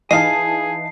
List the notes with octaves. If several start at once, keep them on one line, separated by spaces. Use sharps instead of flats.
E3 D#4 G#4 D#5 F5 A5 C7